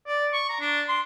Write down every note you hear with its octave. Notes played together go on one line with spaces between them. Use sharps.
D5
C#6
A#5
D4
C6